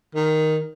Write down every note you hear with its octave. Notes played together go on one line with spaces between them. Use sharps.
D#3